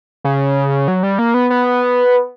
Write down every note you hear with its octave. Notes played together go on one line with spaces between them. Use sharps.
C#3
F#3
G3
A#3
B3
B3